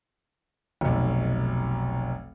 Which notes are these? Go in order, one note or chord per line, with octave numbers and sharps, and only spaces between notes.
F1 B1